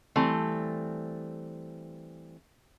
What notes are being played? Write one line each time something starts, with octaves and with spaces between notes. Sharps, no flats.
E3 G3 A3 C4